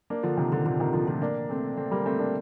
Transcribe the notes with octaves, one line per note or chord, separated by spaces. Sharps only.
A#3 D4
D3 F3
C3 D#3
D3 F3
A#2 D3
C3 D#3
D3 F3
F3 A3
A#3 D4
A3 C4
A3 C4
G3 A#3
A3 C4
A#3 D4